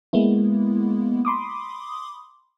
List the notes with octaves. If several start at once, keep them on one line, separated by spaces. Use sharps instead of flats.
G#3 A#3 B3 E4
B5 C6 D6 D#6